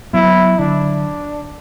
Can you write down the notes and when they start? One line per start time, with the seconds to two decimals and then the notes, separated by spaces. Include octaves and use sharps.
0.13 F#3 B3 E4
0.59 D3 F#3 D4